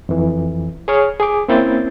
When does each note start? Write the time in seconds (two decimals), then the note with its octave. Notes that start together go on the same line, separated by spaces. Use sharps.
0.09 F2 E3
0.88 G#4 C#5 F6
1.20 G#4 G#5 D6
1.48 A#3 C4 C#4 E4 G6 A6